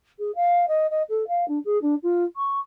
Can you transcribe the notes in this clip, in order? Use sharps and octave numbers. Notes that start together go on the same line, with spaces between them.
G#4
F5
D#5
D#5
A4
F5
D4
G#4
D4
F4
C#6